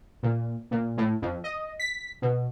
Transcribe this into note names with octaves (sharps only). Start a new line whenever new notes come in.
A#2
A#2
A2
F2
D#5
B6
B2